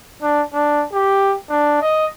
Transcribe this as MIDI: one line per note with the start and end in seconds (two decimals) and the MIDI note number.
0.22 0.41 62
0.53 0.84 62
0.92 1.36 67
1.49 1.77 62
1.81 2.06 75